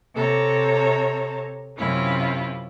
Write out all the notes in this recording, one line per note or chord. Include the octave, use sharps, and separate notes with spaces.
C3 A4 C#5 A#5
F#2 C3 C#4 E4 F4